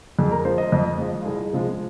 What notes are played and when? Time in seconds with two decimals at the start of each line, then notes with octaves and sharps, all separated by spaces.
0.19 F2 G#4
0.31 A#4
0.45 F3 G#3 C5
0.58 D#5
0.72 F2 D#5
0.98 F3 G#3
1.21 F4
1.25 C2 G#4
1.53 C3 F3 G#3